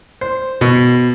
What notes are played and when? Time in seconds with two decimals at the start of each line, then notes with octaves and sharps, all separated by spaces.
0.21 C5
0.61 B2